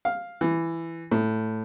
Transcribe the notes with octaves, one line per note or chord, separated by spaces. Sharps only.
F5
E3
A2